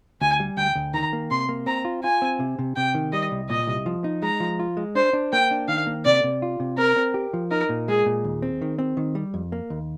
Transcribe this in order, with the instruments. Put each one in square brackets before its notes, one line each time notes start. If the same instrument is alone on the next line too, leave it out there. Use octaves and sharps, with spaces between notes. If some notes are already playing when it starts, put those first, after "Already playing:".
[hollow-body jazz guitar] D2 [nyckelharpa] G#5
[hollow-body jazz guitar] G3
[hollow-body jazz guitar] D2 [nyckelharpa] G5
[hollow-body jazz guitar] D2
[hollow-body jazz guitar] D#3 [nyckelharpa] A#5
[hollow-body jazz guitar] A#3
[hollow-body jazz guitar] C3 [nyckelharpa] C6
[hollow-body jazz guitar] A#3
[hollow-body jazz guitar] C4 [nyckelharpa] A#5
[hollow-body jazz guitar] F4
[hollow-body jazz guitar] F4 [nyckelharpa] G#5
[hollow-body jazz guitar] C4
C3
C3
[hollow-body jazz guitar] C3 [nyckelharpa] G5
[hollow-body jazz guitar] D#3
[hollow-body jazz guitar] G3 [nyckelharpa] D#5
[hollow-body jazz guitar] C2
[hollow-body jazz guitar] A#2 [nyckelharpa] D#5
[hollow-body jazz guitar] C2
F3
D#4
[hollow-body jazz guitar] G#3 [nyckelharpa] A#5
[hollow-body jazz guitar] F3
F4
G#3
[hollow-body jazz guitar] D4 [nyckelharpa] C5
[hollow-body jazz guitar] D4
[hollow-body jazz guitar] A#3 [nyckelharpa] G5
[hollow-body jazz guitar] D4
[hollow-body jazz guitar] D#3 [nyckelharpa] F5
[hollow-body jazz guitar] A#3
[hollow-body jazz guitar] C3 [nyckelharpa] D5
[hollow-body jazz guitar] C3
F4
C3
[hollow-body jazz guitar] C4 [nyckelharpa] A#4
[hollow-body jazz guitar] C4
G4
F3
[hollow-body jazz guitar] D#4 [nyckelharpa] A#4
[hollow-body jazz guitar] A#2
[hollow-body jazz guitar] G#3 [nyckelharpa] G#4
[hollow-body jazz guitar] A#2
D#2
C4
D#3
C4
D#3
G3
F2
A#3
D#2